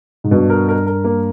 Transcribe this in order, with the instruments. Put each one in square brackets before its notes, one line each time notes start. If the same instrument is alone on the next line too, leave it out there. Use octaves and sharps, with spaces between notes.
[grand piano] G#2
[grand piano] G2 [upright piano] B2
[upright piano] A#4
A#4
A#4
A#3